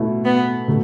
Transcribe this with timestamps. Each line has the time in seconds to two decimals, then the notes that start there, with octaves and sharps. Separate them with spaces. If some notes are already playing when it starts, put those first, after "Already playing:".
Already playing: B2 A3 E4
0.25 B3
0.68 B2 F#3 A3